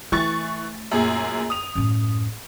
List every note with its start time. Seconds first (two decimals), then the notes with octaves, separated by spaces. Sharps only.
0.12 E3 A3 C#6 A6
0.91 F#2 A#2 G#4
1.50 D#6 F7
1.75 F#2 A2